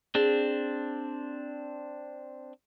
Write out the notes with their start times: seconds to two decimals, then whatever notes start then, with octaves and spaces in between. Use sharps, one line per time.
0.15 C4 D4 G#4